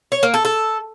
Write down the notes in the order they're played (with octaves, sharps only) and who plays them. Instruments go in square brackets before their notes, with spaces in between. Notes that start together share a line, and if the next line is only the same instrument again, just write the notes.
[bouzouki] C#5
A#3
A4
A4